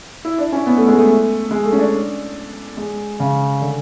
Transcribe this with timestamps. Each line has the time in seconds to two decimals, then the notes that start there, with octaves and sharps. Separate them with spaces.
0.25 E4
0.38 D4
0.52 C#4
0.67 B3
0.77 A3
0.88 G#3
0.98 A3
1.51 G#3
1.65 A3
1.73 C#4
1.79 D4
2.77 G#3
3.20 C#3
3.61 D3